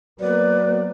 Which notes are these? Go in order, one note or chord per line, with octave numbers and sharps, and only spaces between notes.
F#3 A#3 B3 B4 D5